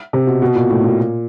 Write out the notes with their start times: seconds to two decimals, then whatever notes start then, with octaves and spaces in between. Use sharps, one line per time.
0.13 C3
0.27 B2
0.42 B2
0.55 A#2
0.69 A2
0.84 A#2